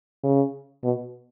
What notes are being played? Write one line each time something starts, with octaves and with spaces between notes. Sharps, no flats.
C#3
B2